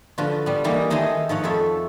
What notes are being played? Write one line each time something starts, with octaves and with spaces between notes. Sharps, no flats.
D3 F3 F4 F#4 B4
G3 B3
E3 G3 A#3 D#4
D#3 D#4 G#4 A4 C5 D#5
F3 D#4 C#5 F#5
F2 F4 A4 E5